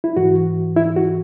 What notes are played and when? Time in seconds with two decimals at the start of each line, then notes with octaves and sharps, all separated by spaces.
0.04 E4
0.16 G#2 E3 F#4
0.76 E4
0.96 F#4